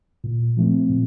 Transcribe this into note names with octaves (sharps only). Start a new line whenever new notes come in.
A#2
F3 A3 C4
A#2